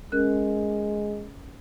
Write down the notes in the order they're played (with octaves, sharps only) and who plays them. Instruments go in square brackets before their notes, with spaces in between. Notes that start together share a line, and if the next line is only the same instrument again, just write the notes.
[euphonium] G#3 [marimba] C#4 A#4 F#6